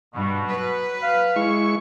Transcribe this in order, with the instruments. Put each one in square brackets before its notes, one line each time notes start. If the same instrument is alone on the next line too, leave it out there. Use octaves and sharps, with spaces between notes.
[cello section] G2 [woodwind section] B2
[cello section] F#3 B4
[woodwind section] F5
[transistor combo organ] G#3 E4 C#6